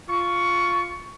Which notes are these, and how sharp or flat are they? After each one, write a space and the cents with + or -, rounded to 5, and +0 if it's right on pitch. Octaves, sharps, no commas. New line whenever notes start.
F4 +0 C#6 +15